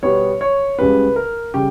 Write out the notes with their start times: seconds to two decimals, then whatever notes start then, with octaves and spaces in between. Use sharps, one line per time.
0.03 B2 G3 B3 C#5
0.41 C#5
0.78 C#2 C#3 G3 B3 B4
1.16 A#4
1.54 C#3 G3 G4